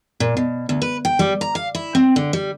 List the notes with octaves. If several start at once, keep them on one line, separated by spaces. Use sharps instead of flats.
A#2
B2
D2
B4
G5
G3
A#5
F5
E4
C4
D3
G3